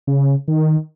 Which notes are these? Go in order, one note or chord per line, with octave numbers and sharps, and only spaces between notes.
C#3
D#3